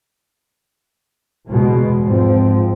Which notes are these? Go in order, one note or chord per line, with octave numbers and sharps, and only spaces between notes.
E2 B2 G#3
G#2 F3 C4